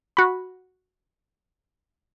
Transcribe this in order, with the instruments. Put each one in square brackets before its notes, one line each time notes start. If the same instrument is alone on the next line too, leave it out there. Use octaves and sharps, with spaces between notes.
[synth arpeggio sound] F#4 B5